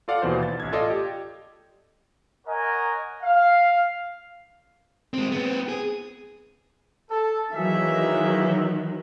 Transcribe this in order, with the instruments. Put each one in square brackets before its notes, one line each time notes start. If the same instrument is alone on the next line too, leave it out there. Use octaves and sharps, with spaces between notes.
[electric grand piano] F4 A4 D5 F5 F#5
D#2 B2 E3 C5
A6
A1 G#6
F4 A4 D5 D#5
G4
[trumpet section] A#4 C#5 D#5 F#5 G#5 A#5
F5
[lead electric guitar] G#3 C4
B3 C4
G#4
[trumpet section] A4
[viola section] D#3 E3 F#3 [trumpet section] A#3 G#4 E5